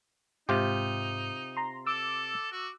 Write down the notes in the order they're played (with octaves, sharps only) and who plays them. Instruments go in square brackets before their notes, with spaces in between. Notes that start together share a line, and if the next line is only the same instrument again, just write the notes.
[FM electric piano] G#2 [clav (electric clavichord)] C3 F4 G4 [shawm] D#4
[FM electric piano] A#5 C6
[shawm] A4 [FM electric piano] D6 E6
[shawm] F#4